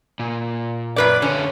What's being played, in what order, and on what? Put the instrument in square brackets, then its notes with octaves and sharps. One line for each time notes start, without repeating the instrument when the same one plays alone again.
[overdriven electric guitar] A#2
[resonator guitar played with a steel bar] F#2 B4 D5
[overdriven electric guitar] D3 C#5 [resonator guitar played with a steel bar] C#4